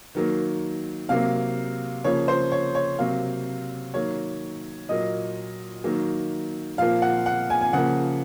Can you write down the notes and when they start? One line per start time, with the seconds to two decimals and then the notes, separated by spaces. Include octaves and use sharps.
0.15 D#3 F#3 A#3
1.09 C3 F#3 A#3 F5
2.04 C#3 F3 A#3 C#5
2.28 C5
2.52 C#5
2.75 C#5
2.99 C3 F#3 A#3 F5
3.94 D#3 F#3 A#3 C#5
4.89 A#2 F#3 A#3 D#5
5.84 D#3 F#3 A#3
6.78 A#2 F3 A#3 F5
7.02 F#5
7.26 F#5
7.50 G#5
7.61 G#5
7.73 C#3 F3 A#3 F#5